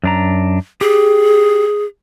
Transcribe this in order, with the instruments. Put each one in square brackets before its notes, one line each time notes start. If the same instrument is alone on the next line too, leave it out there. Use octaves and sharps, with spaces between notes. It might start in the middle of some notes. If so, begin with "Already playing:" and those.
[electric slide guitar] F#2 D4 A#5
[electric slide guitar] G4 [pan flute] G#4